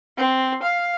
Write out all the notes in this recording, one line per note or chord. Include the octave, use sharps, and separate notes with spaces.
C4
F5